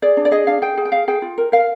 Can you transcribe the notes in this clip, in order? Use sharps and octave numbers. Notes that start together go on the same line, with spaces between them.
G#4 D5
D4
D5
G#4 D#5
D4 F5
G#4 G5
G#4
G5
G#4 F5
G#4 G5
F4
A#4
A#4 F5